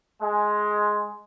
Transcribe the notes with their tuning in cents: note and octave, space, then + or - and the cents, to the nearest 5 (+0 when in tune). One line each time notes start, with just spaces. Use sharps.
G#3 +10